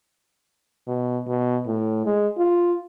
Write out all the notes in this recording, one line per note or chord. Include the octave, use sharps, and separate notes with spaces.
B2
B2
A2
G#3
F4